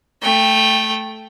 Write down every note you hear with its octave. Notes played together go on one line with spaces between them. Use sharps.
A3 G5